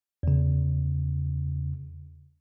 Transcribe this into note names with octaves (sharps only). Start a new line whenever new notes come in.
E2 C#3